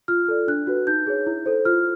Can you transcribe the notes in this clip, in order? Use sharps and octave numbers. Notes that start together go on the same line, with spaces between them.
F4 F6
A4 D5
D4 F#6
F#4 B4
D#4 G6
G#4 C#5
E4
A4 C5
F4 F6